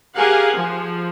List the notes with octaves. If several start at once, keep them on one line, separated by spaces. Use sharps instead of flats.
G4 G#4 A#4 F5 F#5 G#5
F3